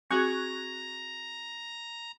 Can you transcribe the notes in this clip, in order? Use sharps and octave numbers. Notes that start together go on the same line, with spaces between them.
C4 F#4 G#4 A#5 C#6 F#6 G#6